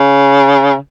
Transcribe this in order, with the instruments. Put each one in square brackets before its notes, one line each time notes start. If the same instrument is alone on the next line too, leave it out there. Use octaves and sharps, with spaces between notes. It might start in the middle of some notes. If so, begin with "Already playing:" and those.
Already playing: [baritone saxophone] C#3